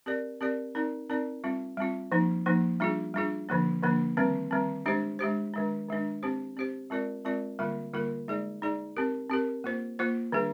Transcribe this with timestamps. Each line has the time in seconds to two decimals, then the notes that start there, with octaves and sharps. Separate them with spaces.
0.06 C4 G4 A#4 D5
0.41 C4 G4 A#4 D5
0.75 C4 D#4 A#4 D5
1.10 C4 D#4 A#4 D5
1.44 G3 C4 F4
1.78 G3 C4 F4
2.12 F3 A#3 D#4
2.46 F3 A#3 D#4
2.80 G3 D4 F4 G#4
3.14 G3 D4 F4 G#4
3.49 D3 F3 A#3 D4
3.83 D3 F3 A#3 D4
4.17 D#3 G3 C4
4.51 D#3 G3 C4
4.86 G#3 D4 G4 C5
5.19 G#3 D4 G4 C5
5.54 D#3 G#3 D4
5.88 D#3 G#3 D4
6.23 C4 G4 C5
6.57 C4 G4 C5
6.90 G#3 C4 F4 A#4 D5
7.25 G#3 C4 F4 A#4 D5
7.59 D3 G3 A#3 F4 A#4
7.93 D3 G3 A#3 F4 A#4
8.28 G#3 D#4 G#4 D5
8.62 G#3 D#4 G#4 D5
8.96 C4 G4 A#4
9.30 C4 G4 A#4
9.64 A#3 F4 C5
9.99 A#3 F4 C5
10.32 D#3 G3 D4 G#4